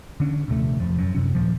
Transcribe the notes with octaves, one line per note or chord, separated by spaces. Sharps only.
D3 C#4 D4
A#1 D#2 C3 A3
F1 F3
F#2
F#2 C3 C#4
D#2 A#2 F3